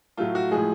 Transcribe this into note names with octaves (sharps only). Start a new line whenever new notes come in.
A2 F#3 A3 F4
F#4
A2 F3 G#3 G#4